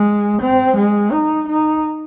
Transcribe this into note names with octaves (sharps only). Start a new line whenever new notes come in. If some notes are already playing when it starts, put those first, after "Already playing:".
Already playing: G#3
C4
G#3
D#4
D#4